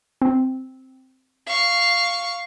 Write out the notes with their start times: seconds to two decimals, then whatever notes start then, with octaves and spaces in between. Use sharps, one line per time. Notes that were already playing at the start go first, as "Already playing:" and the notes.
0.22 C4
1.46 F5 C#6